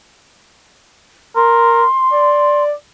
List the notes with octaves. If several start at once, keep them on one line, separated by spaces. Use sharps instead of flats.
A#4 C6
D5